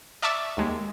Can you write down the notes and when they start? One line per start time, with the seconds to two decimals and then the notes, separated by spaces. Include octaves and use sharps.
0.22 D5 E5 A5 C#6 D6 E6
0.57 D#2 G#3